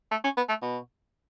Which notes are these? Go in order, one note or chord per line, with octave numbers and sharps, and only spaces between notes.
A3
C#4
B3
A3
B2